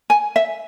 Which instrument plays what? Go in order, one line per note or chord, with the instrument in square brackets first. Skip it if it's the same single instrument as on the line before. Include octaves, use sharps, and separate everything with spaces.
[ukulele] G#5
E5